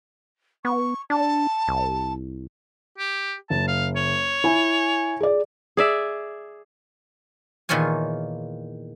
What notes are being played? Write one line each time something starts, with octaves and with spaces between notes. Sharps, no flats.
B3 C#6
D4 A5
C2
G4
F#1 A5
F5
C#5
E4 G#5
G#4 D5
G#4 D5 E5
E2 A#2 D#3 F4 C#5 G#5